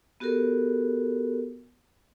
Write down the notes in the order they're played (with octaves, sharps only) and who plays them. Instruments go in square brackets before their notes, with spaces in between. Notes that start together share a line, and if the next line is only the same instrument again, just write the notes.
[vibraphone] B3 F#4 G4 A4 A#4